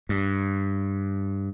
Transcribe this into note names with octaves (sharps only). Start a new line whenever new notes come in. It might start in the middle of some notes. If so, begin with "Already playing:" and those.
G2